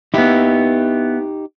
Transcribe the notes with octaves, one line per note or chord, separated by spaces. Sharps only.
B3 D#4 E4 G4